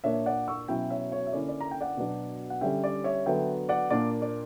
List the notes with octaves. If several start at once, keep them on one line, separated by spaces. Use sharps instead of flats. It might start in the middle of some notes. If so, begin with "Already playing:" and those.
A#2 A#3 D4 C#5 E5
D5 F#5
C#6 E6
B2 F#3 C#4 E4 E5 G5
C#5 E5
C#5
E5
D3 A#3 C#4 E4 D5
D5
A#5
G5
D5 F#5
B2 F#3 B3 D4
F#5
D3 G3 C#4 E5 G5
D5
C#5 E5
D3 F#3 B3 E5 G5
D5 F#5
A#2 A#3 D4 D5
D5